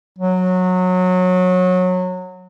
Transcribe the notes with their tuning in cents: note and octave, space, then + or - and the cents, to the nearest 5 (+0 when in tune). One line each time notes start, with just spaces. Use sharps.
F#3 -20